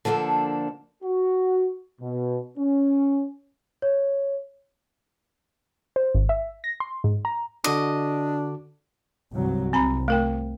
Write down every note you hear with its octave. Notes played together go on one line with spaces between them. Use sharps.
D3 F3 A#3 D4 A4
F#4
B2
C#4
C#5
C5
G#1
E5
A#6
C6
G#2
A#5
D3 D4 F#4 D#5 D6
C2 G2 F#3
C2 C4 A#5 B5
A3 A#4 G5